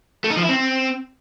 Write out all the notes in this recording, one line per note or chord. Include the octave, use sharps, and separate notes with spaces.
A3
D#4
F3
E4
C4